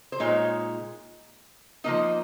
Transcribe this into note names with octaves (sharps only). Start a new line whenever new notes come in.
C5
A#2 G#3 D#4 C#5
F3 A#3 D#4 D#5